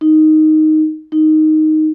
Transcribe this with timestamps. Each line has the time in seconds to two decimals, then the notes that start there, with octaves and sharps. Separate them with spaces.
0.01 D#4
1.12 D#4